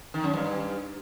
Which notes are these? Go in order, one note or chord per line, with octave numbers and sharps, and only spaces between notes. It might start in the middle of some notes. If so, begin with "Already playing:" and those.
D#3
F#2
G2